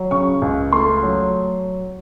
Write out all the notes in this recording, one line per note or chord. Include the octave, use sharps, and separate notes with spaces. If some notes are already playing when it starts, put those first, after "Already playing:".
Already playing: F#3
C#3 C#6
C#2
A3 C6
F#3